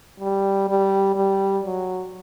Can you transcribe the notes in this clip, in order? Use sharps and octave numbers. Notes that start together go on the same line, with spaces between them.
G3
G3
G3
F#3